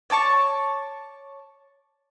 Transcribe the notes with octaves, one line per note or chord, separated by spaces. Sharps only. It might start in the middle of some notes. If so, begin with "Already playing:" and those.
C#5 D5 A5 C#6